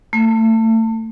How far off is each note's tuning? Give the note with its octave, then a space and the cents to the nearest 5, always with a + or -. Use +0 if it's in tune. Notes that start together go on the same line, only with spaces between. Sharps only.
A3 +30